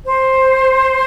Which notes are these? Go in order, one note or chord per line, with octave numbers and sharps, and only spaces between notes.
C5